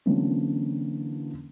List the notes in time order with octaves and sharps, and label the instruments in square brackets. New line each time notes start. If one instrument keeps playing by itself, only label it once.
[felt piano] D3 E3 F#3 A#3 C4 C#4